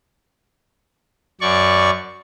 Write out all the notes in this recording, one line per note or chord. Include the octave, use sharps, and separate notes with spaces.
F#2 D5 C#6